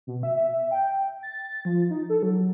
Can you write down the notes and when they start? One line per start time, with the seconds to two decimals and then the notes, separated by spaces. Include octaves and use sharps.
0.07 B2
0.23 E5
0.36 E5
0.71 G5
1.23 A6
1.65 F3
1.90 D#4
2.10 A4
2.23 F#3